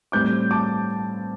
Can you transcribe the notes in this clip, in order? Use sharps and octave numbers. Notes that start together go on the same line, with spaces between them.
A2 G3 C4 D6 G6
A5 D6